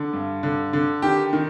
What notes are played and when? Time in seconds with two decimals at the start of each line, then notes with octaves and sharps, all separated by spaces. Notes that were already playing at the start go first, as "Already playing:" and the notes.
Already playing: D3
0.13 G2
0.43 D3
0.73 D3
1.02 D#3 G4
1.33 D#3